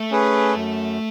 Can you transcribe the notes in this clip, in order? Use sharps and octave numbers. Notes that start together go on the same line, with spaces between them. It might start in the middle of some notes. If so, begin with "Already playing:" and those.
Already playing: A3
C#4 G#4 B4
F#2